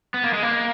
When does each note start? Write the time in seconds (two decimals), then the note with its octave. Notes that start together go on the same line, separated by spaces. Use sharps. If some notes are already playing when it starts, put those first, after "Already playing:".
0.14 B3
0.24 A#3
0.33 G#3
0.43 A#3